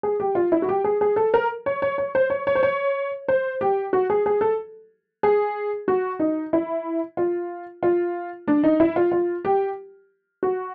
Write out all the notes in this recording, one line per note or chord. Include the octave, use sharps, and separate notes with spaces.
G#4
G4
F4
E4
F#4
G4
G#4
G#4
A4
A#4
C#5
C#5
C#5
C5
C#5
C#5
C5
C#5
C5
G4
F#4
G#4
G#4
A4
G#4
F#4
D#4
E4
F4
F4
D4
D#4
E4
F4
F4
G4
F#4